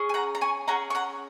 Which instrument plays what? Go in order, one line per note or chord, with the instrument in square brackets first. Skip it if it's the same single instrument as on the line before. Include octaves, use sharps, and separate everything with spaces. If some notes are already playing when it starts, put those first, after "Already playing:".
Already playing: [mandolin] C#4 G#4
G#5
F#5 A#5
A#5
G#5 C#6
C#4 G#4 F#5 A#5
C#6
F#5 A#5